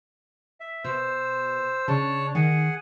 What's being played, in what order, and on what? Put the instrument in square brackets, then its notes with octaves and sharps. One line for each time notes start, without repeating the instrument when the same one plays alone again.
[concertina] E5
[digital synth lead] B2 [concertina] C5 E6
[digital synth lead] C#3 [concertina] D4 C#5 A5
[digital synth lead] D#3 [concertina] G#4 F#5 G#5